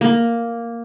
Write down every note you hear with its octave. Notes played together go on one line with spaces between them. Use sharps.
A#3